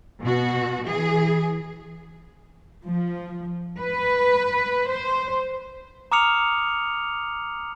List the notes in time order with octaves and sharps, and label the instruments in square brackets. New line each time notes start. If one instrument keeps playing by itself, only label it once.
[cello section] B2 F#4
E3 G#4
F3
B4
C5
[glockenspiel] A#5 D6 D#6 F6 C#7 F7